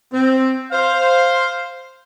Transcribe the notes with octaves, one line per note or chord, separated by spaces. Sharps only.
C4
C5 F5